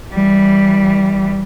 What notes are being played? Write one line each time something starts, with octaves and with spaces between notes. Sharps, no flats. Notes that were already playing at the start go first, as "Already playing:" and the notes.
E3 G3